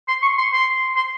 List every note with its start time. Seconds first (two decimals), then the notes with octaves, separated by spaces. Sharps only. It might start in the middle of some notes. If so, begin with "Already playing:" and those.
0.08 C6
0.22 C#6
0.38 C6
0.53 C6
0.96 C6